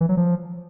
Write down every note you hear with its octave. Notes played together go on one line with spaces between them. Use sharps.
E3
F#3
F3